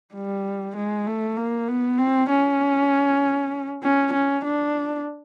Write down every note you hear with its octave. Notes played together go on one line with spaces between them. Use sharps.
G3
G#3
A3
A#3
B3
C4
C#4
C#4
C#4
D4